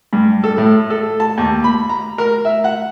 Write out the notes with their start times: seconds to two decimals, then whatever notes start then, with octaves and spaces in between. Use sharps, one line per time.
0.13 G2
0.44 A4
0.58 A2
0.90 A4
1.20 A5
1.38 D#2
1.64 B5
1.89 A#5
2.18 A#4
2.45 E5
2.64 F#5